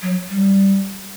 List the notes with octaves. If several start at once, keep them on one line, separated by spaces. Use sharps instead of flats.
F#3
G3